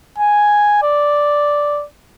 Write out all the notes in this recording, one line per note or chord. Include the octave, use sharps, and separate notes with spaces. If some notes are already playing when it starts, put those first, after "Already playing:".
G#5
D5